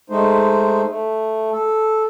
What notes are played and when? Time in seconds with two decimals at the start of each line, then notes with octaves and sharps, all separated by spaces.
0.10 G#3 A3 D#4 C5
0.88 A3
1.52 A4